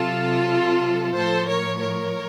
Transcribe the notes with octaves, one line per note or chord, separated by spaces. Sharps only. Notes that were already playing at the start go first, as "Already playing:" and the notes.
Already playing: C3 F#3 F4 A4
A2 F3 A4 C5
A#4 C#5
A#4 C#5